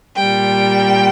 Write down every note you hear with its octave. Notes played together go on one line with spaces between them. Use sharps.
A#2 G3 G5